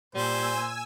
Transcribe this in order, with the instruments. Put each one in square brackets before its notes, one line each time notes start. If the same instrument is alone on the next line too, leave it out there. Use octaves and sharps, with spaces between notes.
[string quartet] A#2 [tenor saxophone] G3 [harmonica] C5 [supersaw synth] G#5 E6